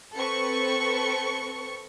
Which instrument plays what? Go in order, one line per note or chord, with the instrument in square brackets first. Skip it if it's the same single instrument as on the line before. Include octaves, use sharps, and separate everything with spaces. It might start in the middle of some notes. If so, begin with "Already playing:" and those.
[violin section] C4 A4 B4 C#6 C#7